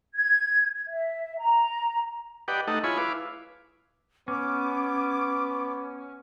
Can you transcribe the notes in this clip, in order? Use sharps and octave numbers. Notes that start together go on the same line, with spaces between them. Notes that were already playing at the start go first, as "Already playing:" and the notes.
G#6
E5
A#5
G4 B4 D5 D#5 F#5 G5
A3 D#4 A4 D#5 F#5
E4 F4 G#4 C#5 G#5 B5
E4 B4 F5 D6
B3 C#4 D6